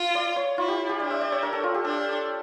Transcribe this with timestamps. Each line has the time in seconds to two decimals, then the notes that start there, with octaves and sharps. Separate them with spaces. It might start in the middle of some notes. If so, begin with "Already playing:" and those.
Already playing: F4
0.15 D5
0.36 C#5
0.58 E4 F4
0.68 G4
0.89 G4
1.00 D4 D5
1.10 E5
1.21 D5
1.32 C#5
1.43 A#4
1.53 A4
1.63 F4
1.74 G4
1.85 D4 A4